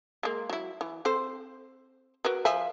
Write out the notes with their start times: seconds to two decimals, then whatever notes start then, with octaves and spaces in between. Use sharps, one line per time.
0.23 G#3 A#3
0.50 F#3 E4
0.81 E3
1.05 C4 A4 C5
2.25 F#4 A#4 B4
2.45 F3 E5 G#5